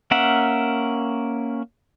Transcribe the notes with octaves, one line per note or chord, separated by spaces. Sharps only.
A#3 C#4 A#4 E5 F#5